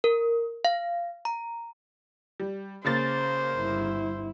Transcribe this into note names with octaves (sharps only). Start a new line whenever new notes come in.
A#4
F5
A#5
G3
C#3 A#3 C5 A6
G1 E4